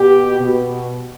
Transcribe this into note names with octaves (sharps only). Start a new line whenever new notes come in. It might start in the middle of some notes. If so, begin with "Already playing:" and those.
Already playing: B2 G4
B2